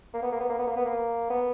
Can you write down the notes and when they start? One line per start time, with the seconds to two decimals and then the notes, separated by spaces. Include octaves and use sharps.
0.14 A#3
0.22 B3
0.32 A#3
0.40 B3
0.50 A#3
0.59 B3
0.67 A#3
0.76 B3
0.85 A#3
1.30 B3